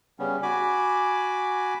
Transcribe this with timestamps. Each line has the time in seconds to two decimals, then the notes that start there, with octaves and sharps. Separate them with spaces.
0.19 C#3 G3 B3 C#4
0.43 F#4 G#5 B5 D6